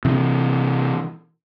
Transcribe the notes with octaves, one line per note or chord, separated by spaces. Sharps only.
C3 E3